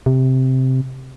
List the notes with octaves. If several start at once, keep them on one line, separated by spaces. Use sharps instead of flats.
C3